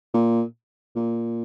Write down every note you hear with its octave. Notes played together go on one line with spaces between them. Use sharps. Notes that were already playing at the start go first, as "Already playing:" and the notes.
A#2
A#2